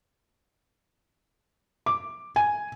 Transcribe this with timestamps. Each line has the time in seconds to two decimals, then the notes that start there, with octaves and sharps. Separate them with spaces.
1.86 D6
2.36 G#5